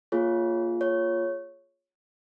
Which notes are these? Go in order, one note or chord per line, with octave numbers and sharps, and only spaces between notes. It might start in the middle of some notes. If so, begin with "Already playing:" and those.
A#3 F4 G#4 C#5
C#5